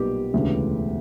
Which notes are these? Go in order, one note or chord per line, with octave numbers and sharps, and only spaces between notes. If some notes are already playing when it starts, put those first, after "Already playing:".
Already playing: B1 A#2 G3 B3 G4
E1 D2 C#3 E3 B3